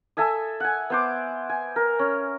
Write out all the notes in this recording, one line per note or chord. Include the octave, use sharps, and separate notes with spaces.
A4 E5 G#5 D#6
F#5 G#5
B3 C5 D6
G#5
A#4
C#4